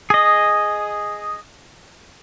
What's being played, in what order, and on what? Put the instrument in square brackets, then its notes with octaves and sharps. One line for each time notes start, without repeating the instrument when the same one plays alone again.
[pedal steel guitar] G#4 D#5